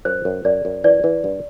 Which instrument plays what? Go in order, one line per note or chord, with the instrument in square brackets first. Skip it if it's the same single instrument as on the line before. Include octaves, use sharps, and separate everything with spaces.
[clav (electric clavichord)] F#2 [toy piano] C5
[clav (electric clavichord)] F#2
[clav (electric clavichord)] F#2 [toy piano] D5
[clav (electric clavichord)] F#2
[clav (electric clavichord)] E3 [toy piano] D5
[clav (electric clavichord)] E3
G2